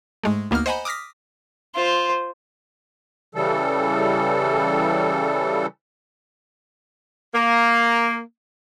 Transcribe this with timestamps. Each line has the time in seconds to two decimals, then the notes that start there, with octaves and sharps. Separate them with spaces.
0.24 G#2 G#3 A3
0.51 D2 A#3 B3 D#4 F6
0.66 C5 D#5 F#5 G#5 A#5 B5
0.85 D6 D#6 F6 A#6 B6
1.76 F4 C5
3.35 C#3 E3 G3 A4
7.34 A#3